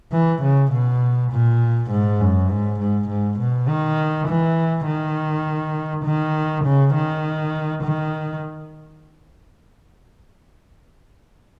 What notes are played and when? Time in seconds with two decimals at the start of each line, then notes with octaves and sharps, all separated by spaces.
0.12 E3
0.42 C#3
0.71 B2
1.32 A#2
1.91 G#2
2.20 F#2
2.50 G#2
2.80 G#2
3.08 G#2
3.39 B2
3.68 D#3
4.28 E3
4.87 D#3
6.05 D#3
6.65 C#3
6.94 D#3
7.83 D#3